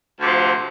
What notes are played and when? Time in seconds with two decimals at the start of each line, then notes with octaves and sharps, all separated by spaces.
0.20 D2 C3 F3